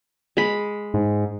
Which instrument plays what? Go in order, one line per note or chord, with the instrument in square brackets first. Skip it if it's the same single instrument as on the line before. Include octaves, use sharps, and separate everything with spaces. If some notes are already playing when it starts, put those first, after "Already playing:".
[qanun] G#3 B5
[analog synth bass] G#2